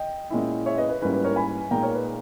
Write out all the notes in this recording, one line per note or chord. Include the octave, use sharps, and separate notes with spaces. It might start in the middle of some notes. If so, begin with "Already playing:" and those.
Already playing: D#5 G5
A#2 G#3 C#4 E4
C#5 E5
B4 D#5
B4
G#2 G3 A#3 C#4 E4 B4
B4
A#4 C#5
G#5 B5
A#2 G#3 D#4 G5 A#5
A#4 C#5
B4